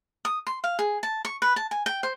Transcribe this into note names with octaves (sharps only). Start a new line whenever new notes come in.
D#6
C6
F5
G#4
A5
C#6
B4
A5
G#5
G5
C5